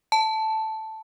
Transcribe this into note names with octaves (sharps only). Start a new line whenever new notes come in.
A5